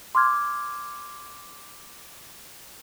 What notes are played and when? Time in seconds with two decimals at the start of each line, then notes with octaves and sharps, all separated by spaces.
0.15 C6 D6 F6 G#6